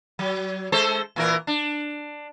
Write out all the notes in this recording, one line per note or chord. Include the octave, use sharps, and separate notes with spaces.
F#3
G#3 A4 C5
A#2 E3 A#4
D4